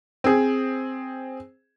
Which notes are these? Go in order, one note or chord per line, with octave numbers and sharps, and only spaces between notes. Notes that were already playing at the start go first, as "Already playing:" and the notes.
C4 G#4